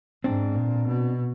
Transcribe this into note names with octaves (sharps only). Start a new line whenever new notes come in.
G#2 C4 D4
A#2
B2